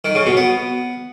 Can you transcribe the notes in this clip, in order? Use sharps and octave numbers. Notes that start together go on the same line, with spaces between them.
D#3
C#3
B2
B3